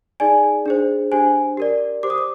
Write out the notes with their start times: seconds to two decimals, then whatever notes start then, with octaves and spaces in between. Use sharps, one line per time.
0.20 D#4 G#4 D5 G#5
0.66 D4 G#4 C5
1.12 D4 G4 C5 G#5
1.57 G4 A#4 D5
2.03 G4 C5 D6
2.10 D#6
2.18 D6